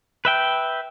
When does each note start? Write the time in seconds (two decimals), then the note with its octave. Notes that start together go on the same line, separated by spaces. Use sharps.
0.25 B4 E5 G5